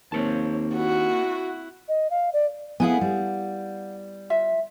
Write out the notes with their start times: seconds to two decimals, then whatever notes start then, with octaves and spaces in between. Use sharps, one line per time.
0.12 D#2 A#3 C4 A#4 C#5 A5
0.76 E4 F#4 F#5
1.89 D#5
2.11 F5
2.33 D5
2.80 B3 E4 G#4 F5 F#5 G#5
3.01 G3
4.30 F4 E5